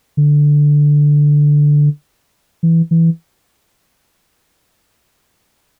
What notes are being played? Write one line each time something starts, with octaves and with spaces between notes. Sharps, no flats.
D3
E3
E3